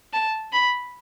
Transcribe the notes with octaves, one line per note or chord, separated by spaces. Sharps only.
A5
B5